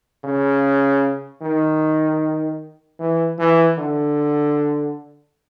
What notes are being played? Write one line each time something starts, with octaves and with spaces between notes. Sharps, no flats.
C#3
D#3
E3
E3
D3